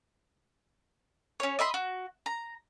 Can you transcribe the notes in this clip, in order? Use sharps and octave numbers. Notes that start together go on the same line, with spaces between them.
C#4 C#5
D#5 E5 B5 C6
F#4
A#5